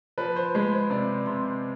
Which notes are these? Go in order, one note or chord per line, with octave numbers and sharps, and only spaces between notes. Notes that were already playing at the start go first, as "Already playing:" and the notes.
F3 B4
C5
G#3 B4
C5
C3 D5
C3 C6